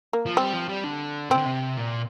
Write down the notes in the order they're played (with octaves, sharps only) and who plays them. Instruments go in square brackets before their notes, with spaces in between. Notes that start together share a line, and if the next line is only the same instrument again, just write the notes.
[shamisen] A#3
[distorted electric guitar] F3
[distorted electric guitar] G3 [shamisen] C4
[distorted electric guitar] F3
G3
D3
[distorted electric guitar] C3 [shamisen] C4
[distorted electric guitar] D3
C3
A#2